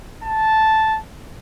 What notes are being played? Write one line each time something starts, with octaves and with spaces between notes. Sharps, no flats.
A5